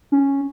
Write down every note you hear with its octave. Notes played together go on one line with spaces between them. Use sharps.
C#4